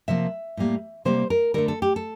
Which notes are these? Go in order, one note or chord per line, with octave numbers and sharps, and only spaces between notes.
C3 F3 A#3 E5
A2 G3 A#3
C3 G3 A#3 C5
A#4
D3 A3 A#4
A4
G4
A4